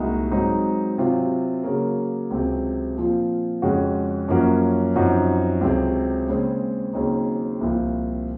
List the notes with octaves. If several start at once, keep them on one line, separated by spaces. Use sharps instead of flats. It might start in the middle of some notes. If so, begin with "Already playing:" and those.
Already playing: C2 A#2 G#3 D#4 F#4
G#2 F#3 C4 D#4
C3 F#3 C4 F4
C#3 F#3 A#3
C#2 C3 F#3 C4
A#2 F3 C4 F4
F2 C#3 G#3 C#4 F#4
F#2 F3 A#3 C#4 F#4
F#2 F3 C4 D#4 F#4
C#2 C3 F#3 C4
D#2 C#3 G#3 C4
D#2 C#3 F#3 C4 D#4
C2 A#2 F3 C4 F4